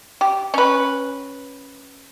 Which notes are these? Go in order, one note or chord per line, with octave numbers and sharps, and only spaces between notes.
G4
C#4 B4